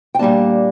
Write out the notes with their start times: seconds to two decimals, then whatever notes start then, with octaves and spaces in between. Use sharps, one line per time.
0.15 G5
0.19 A#2 G3 A#3 D4 A5